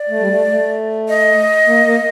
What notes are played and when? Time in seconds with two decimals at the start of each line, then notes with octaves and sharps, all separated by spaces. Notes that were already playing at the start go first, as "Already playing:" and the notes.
Already playing: D5
0.09 A3
0.20 G3
0.29 A3
0.49 A3
1.09 D#5
1.67 A#3
1.86 A#3